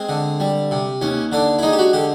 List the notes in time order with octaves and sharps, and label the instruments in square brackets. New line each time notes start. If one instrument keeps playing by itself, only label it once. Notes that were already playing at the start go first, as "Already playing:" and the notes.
Already playing: [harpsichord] G#3 C4
D3
G3
C3
D#2 C#4
D3 D4
E4
G#3 D#4
G4
F#4
D3 G4